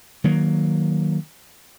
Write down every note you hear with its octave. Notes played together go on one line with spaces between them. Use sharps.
D#3 F#3 A#3